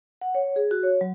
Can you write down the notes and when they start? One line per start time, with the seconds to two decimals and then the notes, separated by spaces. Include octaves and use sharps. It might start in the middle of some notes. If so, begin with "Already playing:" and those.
0.21 F#5
0.35 C#5
0.56 G#4
0.71 F#4
0.83 C#5
1.01 F#3